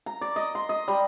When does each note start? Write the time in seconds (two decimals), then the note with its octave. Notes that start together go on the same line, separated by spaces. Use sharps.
0.06 A#5
0.21 D5
0.36 D#5
0.55 C6
0.69 D#5
0.88 G3